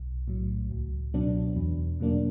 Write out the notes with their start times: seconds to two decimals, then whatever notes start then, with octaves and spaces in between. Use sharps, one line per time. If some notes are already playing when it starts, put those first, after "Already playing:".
Already playing: B1
0.28 A2 F#3
0.71 C#2
1.14 B2 F#3 B3 D4
1.56 E2
2.00 B2 F#3 A#3 D4